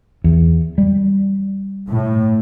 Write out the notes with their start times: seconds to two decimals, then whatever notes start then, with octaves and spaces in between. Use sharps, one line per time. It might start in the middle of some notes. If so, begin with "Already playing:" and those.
0.24 E2
0.78 G3
1.87 A2